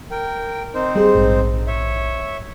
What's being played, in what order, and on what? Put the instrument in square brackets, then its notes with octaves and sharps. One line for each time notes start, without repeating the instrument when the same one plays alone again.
[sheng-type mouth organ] A#4 G5
C4 D#4 C5
[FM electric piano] G3 G#4
A#1 G#2
[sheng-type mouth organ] C#5 E5